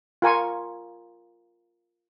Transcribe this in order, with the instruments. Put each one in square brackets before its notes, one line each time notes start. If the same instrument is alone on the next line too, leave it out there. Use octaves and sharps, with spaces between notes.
[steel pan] F4 A#4 G#5 C#6